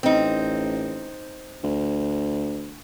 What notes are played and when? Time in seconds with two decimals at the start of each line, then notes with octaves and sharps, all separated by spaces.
0.03 A1 C4 D#4
1.63 D2